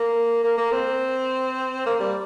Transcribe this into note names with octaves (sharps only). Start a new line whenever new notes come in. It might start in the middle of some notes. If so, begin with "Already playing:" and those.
Already playing: A#3
A#3
A#3
C4
A#3
G3